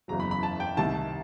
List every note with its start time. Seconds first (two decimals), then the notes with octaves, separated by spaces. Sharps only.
0.08 F#1 E2 C#3 F#3 A#5
0.20 B5
0.31 B5
0.43 A5
0.60 G5
0.77 C2 C3 D#3 A5